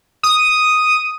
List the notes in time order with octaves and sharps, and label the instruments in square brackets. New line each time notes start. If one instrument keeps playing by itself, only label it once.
[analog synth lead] D#6